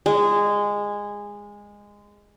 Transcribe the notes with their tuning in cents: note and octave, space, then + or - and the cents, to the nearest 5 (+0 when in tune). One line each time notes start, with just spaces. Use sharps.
G#3 -15